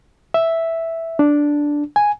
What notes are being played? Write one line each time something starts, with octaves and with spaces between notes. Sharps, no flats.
E5
D4
G#5